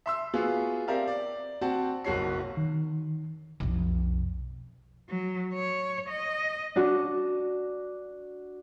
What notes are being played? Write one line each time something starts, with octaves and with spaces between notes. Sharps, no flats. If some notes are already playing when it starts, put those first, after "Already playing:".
E5 C6 E6
B3 F4 F#4 G#4
C4 G4 A#4 D5 E5 F5
D5
C4 F#4 F#5 A5
F#1 B1 F#4 C#5 C7
D#3
B1 F2
F#3
C#5
D#5
D4 F#4